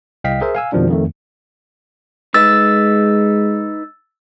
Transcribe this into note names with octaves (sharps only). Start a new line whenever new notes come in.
C2 D#5 F5 G5 B6
G#4 A#4 C5 E5
F5 G#5 E6
F2 B2 D#3 F3 G3 D4
F2 D#3 A3
G#3 D#4 B4 E6 A6